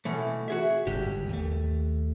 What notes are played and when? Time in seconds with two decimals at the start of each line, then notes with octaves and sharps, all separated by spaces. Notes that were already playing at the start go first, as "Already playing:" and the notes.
0.05 B2 E3 A3
0.48 F#4 G#4 E5
0.87 G1 G#2 G4
1.29 D#2 A3